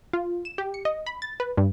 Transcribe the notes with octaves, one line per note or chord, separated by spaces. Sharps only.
F4
E7
G4
C#7
D#5
B5
A6
B4
G2